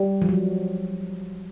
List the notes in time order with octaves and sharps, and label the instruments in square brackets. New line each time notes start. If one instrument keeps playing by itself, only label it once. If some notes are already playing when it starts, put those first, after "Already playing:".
Already playing: [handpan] G3
F3
F#3